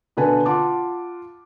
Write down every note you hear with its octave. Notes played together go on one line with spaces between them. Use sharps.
B2 D3 B4 G#5 A5
F4 F#5 A5 D6